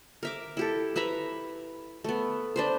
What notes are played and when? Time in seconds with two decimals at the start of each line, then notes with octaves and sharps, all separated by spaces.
0.23 A#4 E5 D6
0.57 E4 G4 A4
0.96 B4 E5 A#5 B5
2.04 A3 B3
2.56 D4 B4 C5